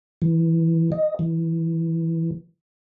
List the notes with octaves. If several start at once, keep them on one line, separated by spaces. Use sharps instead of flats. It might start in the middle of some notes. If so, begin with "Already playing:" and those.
E3
D#5
E3